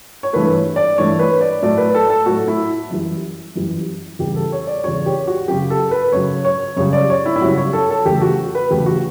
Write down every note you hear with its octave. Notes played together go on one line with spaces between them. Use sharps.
C#5
G2 E3 A3 B4
D5
G2 E3 A3 C#5
B4
D5
A2 F#3 A3 D5
B4
A4
A4
A2 F#3 A3 F#4
E4
F#2 E3 G3
F#2 E3 G3
E2 C#3 G3 G4
A4
C#5
D5
E2 C#3 G3 C#5
G4
F#4
F#2 C#3 F#3 G4
A4
B4
F#2 C#3 F#3 C#5
C#5
F#2 C#3 G3 C#5
D5
C#5
E4
E4
F#2 C#3 G3 F#4
C#5
A4
A4
E2 C#3 F#3 A3 G4
F#4
B4
E2 C#3 F#3 A3 G4
F#4